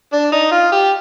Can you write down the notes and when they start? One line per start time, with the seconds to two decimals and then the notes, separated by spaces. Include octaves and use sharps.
0.13 D4
0.32 D#4
0.51 F4
0.72 G4